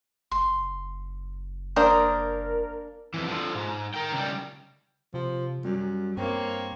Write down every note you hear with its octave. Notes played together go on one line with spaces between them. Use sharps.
F#1 C6
A#3 D4 A#4 C5 A#5 D#6
F2 E3
D3 F3
G#2
A#4 G5
C#2 G3
C3 F3
F#2 G3
G2 A#3 C4 C#5